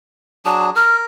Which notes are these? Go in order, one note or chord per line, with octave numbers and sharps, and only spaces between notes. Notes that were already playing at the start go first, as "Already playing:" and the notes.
F#3 D4 G#4 A5
A#4 F6